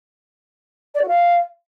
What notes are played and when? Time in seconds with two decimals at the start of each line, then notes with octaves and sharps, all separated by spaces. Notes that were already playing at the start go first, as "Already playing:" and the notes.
0.95 D5
1.01 F#4
1.08 F5